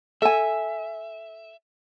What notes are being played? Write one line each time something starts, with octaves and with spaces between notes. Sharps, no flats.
A4 E5 G#5